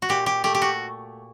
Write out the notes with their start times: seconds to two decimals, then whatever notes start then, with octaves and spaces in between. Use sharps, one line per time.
0.02 F#4
0.09 A#2 G4
0.26 G4
0.44 A3 G4
0.55 G4
0.62 F#4